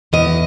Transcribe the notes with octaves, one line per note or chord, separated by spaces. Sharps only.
E2 D#5